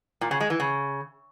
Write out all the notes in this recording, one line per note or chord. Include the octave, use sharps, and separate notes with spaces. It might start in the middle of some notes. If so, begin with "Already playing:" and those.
A#2
C#3
G#3
E3
C#3